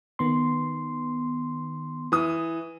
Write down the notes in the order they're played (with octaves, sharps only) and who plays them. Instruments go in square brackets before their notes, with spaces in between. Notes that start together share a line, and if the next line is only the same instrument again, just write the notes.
[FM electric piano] D#3 B3 C6
[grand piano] E3 D#6